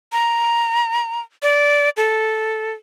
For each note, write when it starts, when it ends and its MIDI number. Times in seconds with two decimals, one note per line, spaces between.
0.12 1.21 82
1.42 1.89 74
1.97 2.72 69